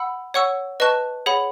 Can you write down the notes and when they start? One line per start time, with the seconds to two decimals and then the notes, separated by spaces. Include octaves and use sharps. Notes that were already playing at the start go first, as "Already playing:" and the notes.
Already playing: F#5 B5 E6
0.34 C#5 F#5 C#6 E6
0.80 B4 D#5 A5 C#6 F#6
1.26 G#4 C#5 F#5 B5